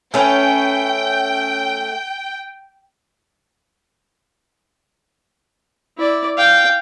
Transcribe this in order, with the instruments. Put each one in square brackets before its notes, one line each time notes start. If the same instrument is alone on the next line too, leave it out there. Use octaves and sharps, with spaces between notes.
[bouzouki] A3 C#4 B4 [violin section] G5
[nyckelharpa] E4 D5
F5 G5